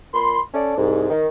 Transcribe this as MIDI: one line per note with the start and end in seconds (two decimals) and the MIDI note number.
0.14 0.39 46
0.14 0.39 83
0.14 0.39 84
0.53 0.76 61
0.53 0.76 69
0.53 0.76 74
0.77 1.09 36
0.77 1.09 44
1.10 1.28 51